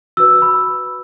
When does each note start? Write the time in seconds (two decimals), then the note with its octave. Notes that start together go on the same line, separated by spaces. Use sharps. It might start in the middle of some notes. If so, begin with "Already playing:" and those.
0.17 F#4 B4 E6
0.42 B5